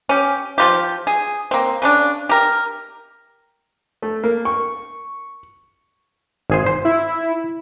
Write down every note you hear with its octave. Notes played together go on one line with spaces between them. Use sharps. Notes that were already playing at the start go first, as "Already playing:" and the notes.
C#4 G4
F3 F4 G4
G#4
A#3 C4
C#3 C#4 D4
G4 A#4
A3
A#3
C#6
G#1 G#4 C5
C5
E4